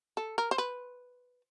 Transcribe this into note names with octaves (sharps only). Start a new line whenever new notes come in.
A4
A#4
C5
B4